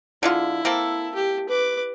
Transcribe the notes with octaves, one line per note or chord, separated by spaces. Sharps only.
D3 G#3 E4 F4
A#3 C4 A4
G4
B4 D6